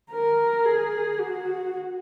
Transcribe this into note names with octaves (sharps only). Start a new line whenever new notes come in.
A#4
G#4
F#4